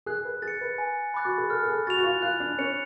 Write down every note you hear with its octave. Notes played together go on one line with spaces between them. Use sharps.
G#4 F#6
B4
G#4 A6
C#7
B4
G#5
B5 D6 F#6 A6
F#4
G#4
A4 F6
A4
G#4
F#4 A6 F7
F#4
F4
F4 F#6
D4
C#4 C#7 F7